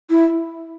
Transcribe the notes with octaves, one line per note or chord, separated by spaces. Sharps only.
E4